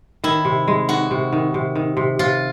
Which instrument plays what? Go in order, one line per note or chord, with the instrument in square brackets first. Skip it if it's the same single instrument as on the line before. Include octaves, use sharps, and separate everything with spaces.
[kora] D#3 [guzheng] E4
[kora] C3
G#3
[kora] D#3 [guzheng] F#4
[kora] C3
D#3
C3
D#3
C3
[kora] C3 [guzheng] F4